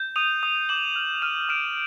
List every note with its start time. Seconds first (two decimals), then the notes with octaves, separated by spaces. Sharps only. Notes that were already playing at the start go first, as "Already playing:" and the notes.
Already playing: G6
0.16 D#6 D#7 F7
0.43 D#6
0.69 D6 E7 F#7
0.96 F6
1.22 F6 D#7 F7
1.49 F6 D7 E7